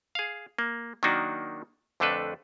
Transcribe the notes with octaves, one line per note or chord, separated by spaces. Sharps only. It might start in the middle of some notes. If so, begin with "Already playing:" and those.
G#4 F5
A#3
D#3 F#3 A#3 D4 D#4 F#4
F2 D3 A3 D4 A4 B4